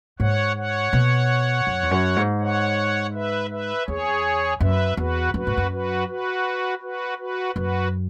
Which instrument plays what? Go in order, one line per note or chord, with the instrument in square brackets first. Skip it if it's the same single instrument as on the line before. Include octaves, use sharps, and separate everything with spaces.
[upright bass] G#2 [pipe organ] C#5 F#5
[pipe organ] C#5 F#5
[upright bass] B2
F#2
E2
F#2
G#2
[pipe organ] C#5 F#5
B4 E5
B4 E5
[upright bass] E2 [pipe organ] G#4 C#5
[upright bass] F#2 [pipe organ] B4 E5
[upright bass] E2 [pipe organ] F#4 B4
[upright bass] F#2 [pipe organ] F#4 B4
[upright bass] G#2
F#2
[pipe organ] F#4 B4
F#4 B4
F#4 B4
F#4 B4
[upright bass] F#2 [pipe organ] F#4 B4